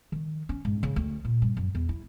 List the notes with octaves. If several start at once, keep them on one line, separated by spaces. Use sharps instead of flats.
D#3
C#4
G#2
C#3
D2
A#2
G2
F#2
E2
E4